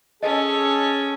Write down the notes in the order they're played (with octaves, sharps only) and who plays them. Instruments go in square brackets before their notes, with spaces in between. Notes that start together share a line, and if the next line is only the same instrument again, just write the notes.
[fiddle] C#4 [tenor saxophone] G#4 [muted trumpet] A4 [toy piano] D#5